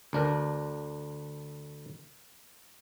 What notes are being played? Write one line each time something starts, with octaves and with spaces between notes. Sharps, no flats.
D2 D4 A#4